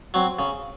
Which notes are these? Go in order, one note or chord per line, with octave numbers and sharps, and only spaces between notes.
F#3 C4
C#3